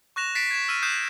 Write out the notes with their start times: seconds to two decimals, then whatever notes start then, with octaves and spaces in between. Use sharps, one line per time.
0.16 C#6 F#6 A#6 E7 F7
0.35 A6 B6 C7 D7
0.51 G#6 E7
0.69 E6 F6 D#7
0.82 D#6 F#6 G6 C7 E7